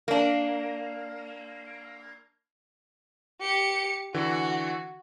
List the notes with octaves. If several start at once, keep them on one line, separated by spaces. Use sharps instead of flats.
A#3 D4
G4 C#7
D3 E3 F#4